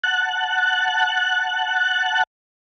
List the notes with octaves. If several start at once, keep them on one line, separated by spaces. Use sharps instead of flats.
F#5 A5 F#6